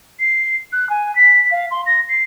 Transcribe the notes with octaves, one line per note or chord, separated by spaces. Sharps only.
C7
F#6
G#5
B6
F5
C6
A#6
C7